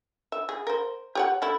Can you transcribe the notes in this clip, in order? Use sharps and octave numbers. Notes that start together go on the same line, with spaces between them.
E5
G#4
A#4 C5
G4 C#5 F#5
F#3 A3 E4